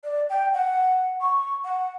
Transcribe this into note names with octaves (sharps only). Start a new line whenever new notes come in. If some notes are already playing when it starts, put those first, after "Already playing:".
D5
G5
F#5
C#6
F#5